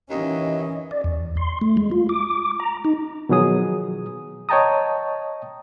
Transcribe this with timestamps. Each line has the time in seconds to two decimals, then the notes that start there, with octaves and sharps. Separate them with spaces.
0.10 D#2 E3 C#4 D#5
0.91 D5
1.04 E2
1.37 C6
1.61 A3
1.77 G#3
1.91 F4
2.09 D6
2.60 A#5
2.85 D#4
3.29 B2 D#3 F3 F#3 G#4 D#6
4.49 C#5 D#5 G5 A5 A#5 D#6